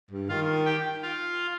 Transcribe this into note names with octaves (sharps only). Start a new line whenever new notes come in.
G2
D#3 F4 F5
G4 G5
F4 F5